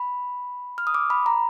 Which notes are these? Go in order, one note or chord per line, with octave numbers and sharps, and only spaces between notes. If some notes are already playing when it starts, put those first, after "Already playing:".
Already playing: B5
F6
D#6
D6
B5
A#5